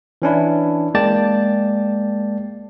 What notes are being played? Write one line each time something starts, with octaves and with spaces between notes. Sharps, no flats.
E3 C#4 D4 E4
G#3 A#3 D5 G5 A5 A6